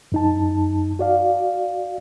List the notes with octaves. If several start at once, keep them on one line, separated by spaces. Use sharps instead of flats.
F#2 D#4 A5
F#4 D5 F5